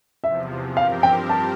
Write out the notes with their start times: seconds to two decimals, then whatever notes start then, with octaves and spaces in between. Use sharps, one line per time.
0.23 E2 C3 F3 E5
0.76 G2 F3 C4 G4 A#4 F5
1.03 G5
1.29 A5